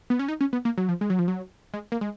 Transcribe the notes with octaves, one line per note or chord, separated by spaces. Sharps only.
B3
C#4
D#4
C#4
B3
A#3
F#3
F3
G#3
F#3
F3
F#3
G#3
A#3
G#3